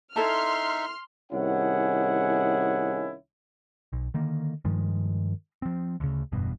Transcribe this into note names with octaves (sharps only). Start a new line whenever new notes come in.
D#4 E4 A4 E5 A5 C6 F6
C2 D#3 C#4 E4 G#4 F#5
B1
D3 D#3 A#3
G2 D#3 F3 G#3
F3 C4
D2 C#3
F#1 E2 G2 B2